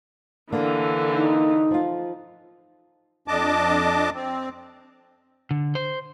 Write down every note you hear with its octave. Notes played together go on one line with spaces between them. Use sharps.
D3 E3 A#3 B3 D4
D#4
F3 F4
F2 D4 D#5 A5 D6
C4
D3
C5